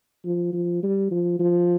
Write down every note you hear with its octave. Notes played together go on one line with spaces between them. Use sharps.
F3
F3
G3
F3
F3